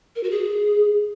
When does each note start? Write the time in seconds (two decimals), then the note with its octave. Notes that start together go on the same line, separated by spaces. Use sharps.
0.16 A#4
0.23 F#4
0.31 G#4